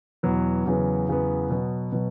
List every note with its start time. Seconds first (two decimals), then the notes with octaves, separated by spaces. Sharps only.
0.23 E2 B2 F#3 B3
0.66 E2 C#3 F#3 B3
1.08 E2 C#3 F#3 B3
1.50 B2 F#3 B3
1.92 B2 F#3